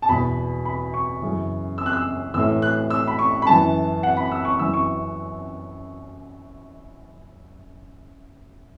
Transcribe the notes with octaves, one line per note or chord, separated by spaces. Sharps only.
A5
E2 B2 B5
B5
C#6
F#2 C#3 E3
E6
F#6
E6
A2 E3 E6
F#6
E6
B5
C#6
B5
F#2 E3 A5
F#5
B5
E6
C#6
F#2 E3 E6
C#6